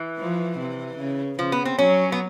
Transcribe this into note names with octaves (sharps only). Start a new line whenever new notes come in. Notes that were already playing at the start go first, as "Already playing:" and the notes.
Already playing: E3
F3
C3
C#3
C#3 F3
B3
C4
F#3 C#4
B3